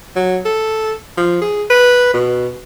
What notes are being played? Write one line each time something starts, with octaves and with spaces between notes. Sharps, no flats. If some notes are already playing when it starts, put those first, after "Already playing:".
F#3
A4
F3
G#4
B4
B2